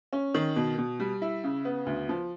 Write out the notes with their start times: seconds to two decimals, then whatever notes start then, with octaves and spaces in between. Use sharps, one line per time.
0.13 C#4
0.35 D#3
0.56 B2
0.78 B2
1.00 G3
1.22 E4
1.44 C#3
1.65 B3
1.86 D2
2.09 F3